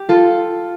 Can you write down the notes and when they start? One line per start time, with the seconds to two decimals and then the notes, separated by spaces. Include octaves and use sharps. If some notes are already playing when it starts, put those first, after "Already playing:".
Already playing: G4
0.09 F4 A4